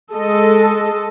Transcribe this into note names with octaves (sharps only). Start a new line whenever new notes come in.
G#3 A4 D#5